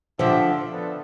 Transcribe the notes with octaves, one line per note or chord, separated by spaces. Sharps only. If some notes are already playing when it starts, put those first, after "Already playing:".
D3 F3 D4 G4 C5 E5
B3 D4 F4 A4